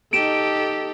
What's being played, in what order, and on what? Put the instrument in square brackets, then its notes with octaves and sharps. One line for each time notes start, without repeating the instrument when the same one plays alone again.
[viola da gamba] D#4 G4 A4 [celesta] D7 E7